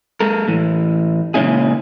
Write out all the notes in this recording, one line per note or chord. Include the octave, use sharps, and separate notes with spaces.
G#3 A4 A#4
A2 E3
A#2 C#3 G#3 C#4 E4 G#4